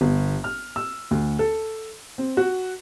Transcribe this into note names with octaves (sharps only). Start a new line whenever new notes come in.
G1
F6
E6
D2
A4
C4
F#4